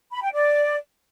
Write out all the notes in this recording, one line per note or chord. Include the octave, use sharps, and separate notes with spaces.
B5
G5
D5